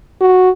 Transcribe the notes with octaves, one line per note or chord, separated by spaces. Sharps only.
F#4